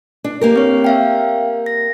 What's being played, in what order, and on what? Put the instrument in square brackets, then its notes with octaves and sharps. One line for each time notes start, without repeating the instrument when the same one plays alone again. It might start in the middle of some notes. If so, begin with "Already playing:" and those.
[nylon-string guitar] D4
A#3 G4 A#4
[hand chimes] C4 C#5
E5 F5 G5
A#6